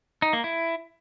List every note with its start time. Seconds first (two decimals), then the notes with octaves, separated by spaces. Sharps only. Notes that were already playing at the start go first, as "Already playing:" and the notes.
0.22 D#4
0.33 A#3
0.44 E4